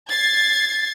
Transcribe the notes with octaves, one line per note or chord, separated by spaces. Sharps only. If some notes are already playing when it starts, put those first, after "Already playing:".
G#6 A6 C7